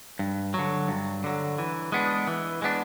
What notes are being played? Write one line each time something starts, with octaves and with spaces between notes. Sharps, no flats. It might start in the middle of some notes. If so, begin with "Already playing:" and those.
G2
D3 F#3
G2
D3 F#3
E3
G#3 B3 D4
E3
G#3 B3 D4